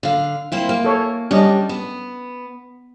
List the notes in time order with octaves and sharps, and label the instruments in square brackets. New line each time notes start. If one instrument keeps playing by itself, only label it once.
[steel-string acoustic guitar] D3 F5
A#3 C4 E4
A#3
[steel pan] A4 C#5
[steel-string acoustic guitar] G3 [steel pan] C#4 D4 D#5
[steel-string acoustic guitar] B3